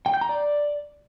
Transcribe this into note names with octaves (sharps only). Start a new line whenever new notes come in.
G5
G6
A#5
D5